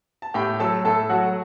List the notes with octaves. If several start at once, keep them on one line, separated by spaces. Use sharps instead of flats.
A5
A2 G4 G5
F#3 A3 A4 A5
A2 A4 A5
F#3 A3 F#4 F#5